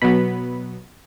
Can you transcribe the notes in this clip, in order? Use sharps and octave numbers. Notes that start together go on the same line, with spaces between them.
B2 F#3 B3 B5